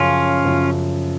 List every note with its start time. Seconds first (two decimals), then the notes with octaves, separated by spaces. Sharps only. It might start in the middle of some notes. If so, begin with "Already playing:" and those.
Already playing: F#2 C#3 F3 C#4 F4
0.45 F#2 C#3 F3